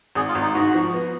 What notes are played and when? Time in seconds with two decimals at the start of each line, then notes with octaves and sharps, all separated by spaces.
0.15 G#1 G#4
0.29 F4
0.35 G#1
0.42 D#4
0.54 G#2 F#4
0.75 F3
0.94 B3